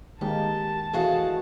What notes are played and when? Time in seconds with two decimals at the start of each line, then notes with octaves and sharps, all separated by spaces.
0.21 D#3 G#3 A#3 G4 A5
0.93 E3 G#3 A3 F#4 G#4 F5